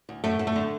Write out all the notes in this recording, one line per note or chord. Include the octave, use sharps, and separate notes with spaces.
D2
F#2 A3
F#2
A3
D3